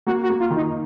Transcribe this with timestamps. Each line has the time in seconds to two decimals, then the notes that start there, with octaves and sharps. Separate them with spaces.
0.07 A#3 F#4
0.23 F#4
0.29 A#3
0.40 F4
0.50 D#3
0.56 D#4